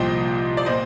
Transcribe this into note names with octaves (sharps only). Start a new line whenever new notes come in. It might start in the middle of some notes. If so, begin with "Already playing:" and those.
Already playing: C2 A#2 F3 D#5 G5
D5
A#2 C5 D#5